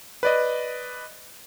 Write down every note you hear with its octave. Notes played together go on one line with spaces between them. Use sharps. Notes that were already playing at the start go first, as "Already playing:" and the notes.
B4 D5 D#5